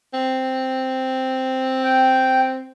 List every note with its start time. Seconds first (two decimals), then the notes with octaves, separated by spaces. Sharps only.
0.14 C4
1.84 G5